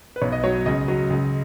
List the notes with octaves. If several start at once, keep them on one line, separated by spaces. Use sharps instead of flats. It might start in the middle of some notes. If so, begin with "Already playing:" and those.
B4
B1 C#5
D#5
F#3 C#5
C#2 D#5
F#3
C#2